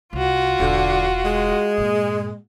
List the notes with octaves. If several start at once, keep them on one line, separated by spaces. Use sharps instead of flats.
C2 F4 F#4
E1 B1 D3
G#3
G2 A#2